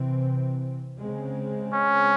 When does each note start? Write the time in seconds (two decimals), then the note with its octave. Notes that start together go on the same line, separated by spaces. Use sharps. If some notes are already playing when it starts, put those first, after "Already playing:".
Already playing: C3 E3 C4
1.00 C#3 G#3 C4
1.73 C#4